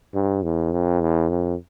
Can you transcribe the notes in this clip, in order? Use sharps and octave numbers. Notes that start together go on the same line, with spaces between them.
G2
E2
F2
E2
F2